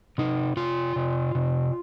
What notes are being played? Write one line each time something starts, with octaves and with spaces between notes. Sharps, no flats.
C3 D#4
C3 F4
C3
C3